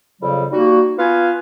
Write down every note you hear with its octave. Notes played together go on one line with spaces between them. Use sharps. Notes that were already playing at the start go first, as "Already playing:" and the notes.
F2 C#3 F#3 G3
G3 A#3 D#4 F#4
B3 F4 B4 F5 G#5